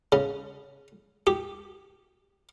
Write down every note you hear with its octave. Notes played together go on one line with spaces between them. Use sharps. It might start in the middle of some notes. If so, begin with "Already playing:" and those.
C#3
G4